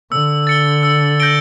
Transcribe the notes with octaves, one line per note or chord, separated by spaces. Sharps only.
D3 E6
A6 C#7 G7
E6
G6 A#6 D7 G7